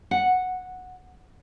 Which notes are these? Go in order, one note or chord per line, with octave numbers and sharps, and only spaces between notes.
F#5